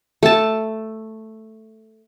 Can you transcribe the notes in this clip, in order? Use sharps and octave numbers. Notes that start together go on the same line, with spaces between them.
A3 A5